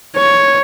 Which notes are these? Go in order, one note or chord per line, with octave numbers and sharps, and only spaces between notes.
C#5